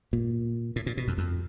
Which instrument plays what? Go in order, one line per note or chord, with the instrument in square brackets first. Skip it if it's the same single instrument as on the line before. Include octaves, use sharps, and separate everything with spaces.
[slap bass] A#2
A2
A#2
B2
F2
F2